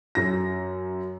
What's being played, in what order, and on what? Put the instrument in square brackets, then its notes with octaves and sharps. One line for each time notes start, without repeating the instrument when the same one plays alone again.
[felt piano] F#2 A#6